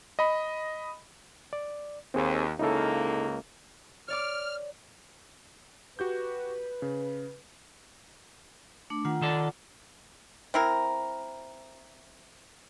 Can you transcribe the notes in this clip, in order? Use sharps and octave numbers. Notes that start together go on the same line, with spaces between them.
D#5 B5
D5
D#2 C4 G#4
C#2 C#3 A#3 D#4 E4 A4
C#5 D5 D6 F6
F#4 G4 B4 G6
C#3
A3 D4 D6
D#3 F4 F#5
D#3 A4 D5
C4 E4 A#4